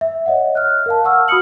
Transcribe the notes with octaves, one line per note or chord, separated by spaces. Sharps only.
E5
C#5 D#5 E5 F#5
F6 F#6
A#4 F5 A5
F#5 C#6 E6 F6
F#4 B5 D#6 F6 C#7 F#7